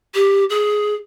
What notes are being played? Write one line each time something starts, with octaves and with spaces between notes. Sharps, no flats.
G4
G#4